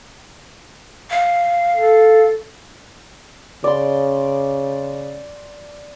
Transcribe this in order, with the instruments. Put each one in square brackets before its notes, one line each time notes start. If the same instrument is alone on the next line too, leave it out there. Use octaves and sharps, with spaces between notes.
[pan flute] F5
[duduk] A4
[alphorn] C#3 [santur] D5 C6